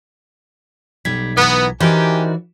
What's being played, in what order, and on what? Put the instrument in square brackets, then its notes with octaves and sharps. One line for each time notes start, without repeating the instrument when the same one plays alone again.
[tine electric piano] B1 G#6 B6 [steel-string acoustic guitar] G3
[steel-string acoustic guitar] E3 A#4 [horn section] B3
[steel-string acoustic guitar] E3 F#4 D5 [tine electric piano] D#4 A#4 C5 [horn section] G4 G#5